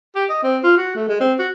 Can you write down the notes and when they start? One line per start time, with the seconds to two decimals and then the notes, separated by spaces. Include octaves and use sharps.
0.15 G4
0.29 D#5
0.43 C4
0.63 F4
0.77 F#4
0.95 A3
1.09 G#3
1.20 C4
1.39 F#4